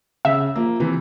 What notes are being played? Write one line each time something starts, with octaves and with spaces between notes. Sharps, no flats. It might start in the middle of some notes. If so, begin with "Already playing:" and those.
C#3 E5
F3 A#3
C3 E3